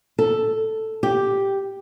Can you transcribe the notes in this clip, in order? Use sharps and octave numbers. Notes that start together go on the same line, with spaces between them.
A4
G4